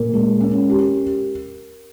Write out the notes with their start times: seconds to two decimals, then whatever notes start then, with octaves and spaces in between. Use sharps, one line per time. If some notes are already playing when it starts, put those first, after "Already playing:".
Already playing: A#2 A#4
0.13 G#3
0.41 C#4
0.70 G4